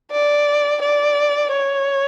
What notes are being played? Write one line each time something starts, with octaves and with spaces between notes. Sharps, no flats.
D5
D5
C#5